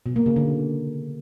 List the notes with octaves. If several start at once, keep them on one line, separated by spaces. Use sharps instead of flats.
B2
A#3
C#3
D3